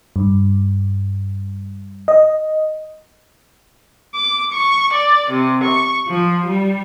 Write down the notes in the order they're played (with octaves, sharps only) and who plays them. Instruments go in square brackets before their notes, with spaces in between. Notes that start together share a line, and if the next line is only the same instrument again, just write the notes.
[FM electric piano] G2
D#5
[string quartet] D6
C#6
D5
C3
C#6
F3
G3